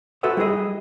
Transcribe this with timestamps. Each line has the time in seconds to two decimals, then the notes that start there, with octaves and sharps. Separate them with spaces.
0.23 F#4 A4 B4 C5 E5 F#5
0.37 G3 E4 G#4 D#5